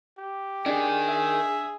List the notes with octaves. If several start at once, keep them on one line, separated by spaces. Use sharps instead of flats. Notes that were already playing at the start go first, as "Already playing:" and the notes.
G4
D4 G#4 A#4 D#5
E5